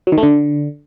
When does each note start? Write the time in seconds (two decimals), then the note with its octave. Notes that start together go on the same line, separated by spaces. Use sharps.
0.07 F#3
0.12 D#3
0.18 A3
0.23 D3